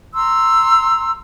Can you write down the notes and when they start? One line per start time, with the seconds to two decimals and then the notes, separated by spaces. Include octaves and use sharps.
0.15 A#5 C6 E6